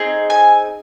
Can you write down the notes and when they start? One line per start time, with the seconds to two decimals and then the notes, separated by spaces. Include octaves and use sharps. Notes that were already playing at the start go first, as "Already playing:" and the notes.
Already playing: C4 D#4 G#4
0.30 G#5